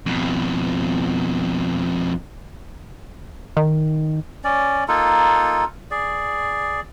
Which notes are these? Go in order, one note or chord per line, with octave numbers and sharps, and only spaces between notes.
F2 B2
D#3
C#4 D5
A#3 D#4 F4 A4
G#4 D5